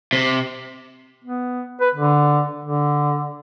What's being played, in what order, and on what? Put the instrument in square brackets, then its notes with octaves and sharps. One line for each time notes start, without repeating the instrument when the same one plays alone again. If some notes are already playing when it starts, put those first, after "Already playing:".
[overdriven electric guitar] C3
[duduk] B3
B4
D3
D3